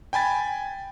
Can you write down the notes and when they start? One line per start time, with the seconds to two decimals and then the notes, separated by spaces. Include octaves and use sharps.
0.13 G5 G#5 B5 A6